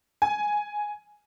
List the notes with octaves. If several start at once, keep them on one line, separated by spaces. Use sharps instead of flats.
G#5